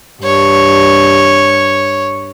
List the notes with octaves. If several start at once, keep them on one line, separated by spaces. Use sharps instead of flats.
G2 C#5